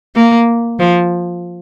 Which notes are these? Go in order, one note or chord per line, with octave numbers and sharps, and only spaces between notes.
A#3
F3